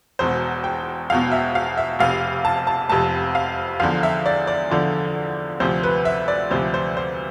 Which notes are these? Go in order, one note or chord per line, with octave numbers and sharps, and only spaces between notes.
E1 E2 B2 C5
G5
E1 E2 B2 F5
E5
F5
E5
F1 F2 C3 F5
A5
A5
F1 F2 C3 A5
F5
E2 D3 F3 F5
E5
D5
D5
E2 D3 F3
D2 C3 F3 C5
B4
E5
D5
D2 C3 F3 C5
C5
C5